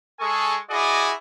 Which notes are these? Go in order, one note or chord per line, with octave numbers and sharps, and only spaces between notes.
G#3 G#4 A4 G#5 C#6
E4 F#4 G#4 D5 D#5